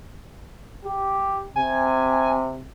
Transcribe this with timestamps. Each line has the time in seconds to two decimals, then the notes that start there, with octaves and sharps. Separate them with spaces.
0.85 G4
1.56 C3 G#5